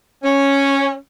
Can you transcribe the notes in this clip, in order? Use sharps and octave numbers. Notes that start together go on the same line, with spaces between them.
C#4